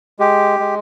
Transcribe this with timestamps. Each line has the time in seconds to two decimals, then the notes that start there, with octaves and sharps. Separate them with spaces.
0.19 G#3 G4
0.59 G#3